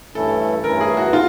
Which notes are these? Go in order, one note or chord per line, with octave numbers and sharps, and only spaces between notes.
G2 E3 A3 C#4 E4 A4
G2 E3 A3 C#4 E4 A#4
G#4
F#4
B3 F4